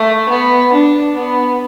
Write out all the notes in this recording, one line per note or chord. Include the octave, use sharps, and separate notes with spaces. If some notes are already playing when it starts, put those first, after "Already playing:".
Already playing: A3
B3
D4
B3